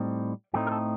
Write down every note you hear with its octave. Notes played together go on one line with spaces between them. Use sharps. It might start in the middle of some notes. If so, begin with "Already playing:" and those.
Already playing: A2 G3 C4 D#4
A2 A3 C4 D#4 G4
A#4
A4